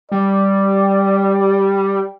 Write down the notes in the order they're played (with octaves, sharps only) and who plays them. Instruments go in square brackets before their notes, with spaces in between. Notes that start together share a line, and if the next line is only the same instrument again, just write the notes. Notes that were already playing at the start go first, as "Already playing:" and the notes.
[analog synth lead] G3 [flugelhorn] D5